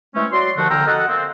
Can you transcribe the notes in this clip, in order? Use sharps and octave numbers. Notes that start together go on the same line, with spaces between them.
E3 G#3 A3 C4 C#4
F#3 F#4 D5 C6
D#2 D3 F3 A3 F#4 F#5
C2 D3 G5 A#5 E6 F6
F#4 A4 D#5 F#5
A#3 C4